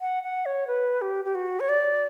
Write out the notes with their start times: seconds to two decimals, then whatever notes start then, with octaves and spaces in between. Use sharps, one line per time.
0.01 F#5
0.23 F#5
0.46 C#5
0.67 B4
1.02 G4
1.25 G4
1.35 F#4
1.60 C#5
1.69 D5